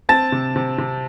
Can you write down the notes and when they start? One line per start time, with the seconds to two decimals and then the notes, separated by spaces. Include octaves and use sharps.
0.09 C4 A5 A6
0.32 C3
0.56 C3
0.78 C3